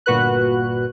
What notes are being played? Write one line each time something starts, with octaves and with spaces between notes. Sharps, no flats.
G1 A#2 F#4 B4 F#6